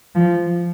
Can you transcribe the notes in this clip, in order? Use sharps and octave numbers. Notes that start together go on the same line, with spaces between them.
F3